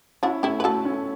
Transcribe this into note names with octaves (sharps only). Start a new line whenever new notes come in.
C#4 D4 E4 F#4
A3 C#4 E4 G4
B4
A3 F#4 A4
A3 C#4